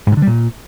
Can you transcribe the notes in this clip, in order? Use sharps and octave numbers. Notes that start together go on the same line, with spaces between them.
G#2
C3
D3
G3
A#2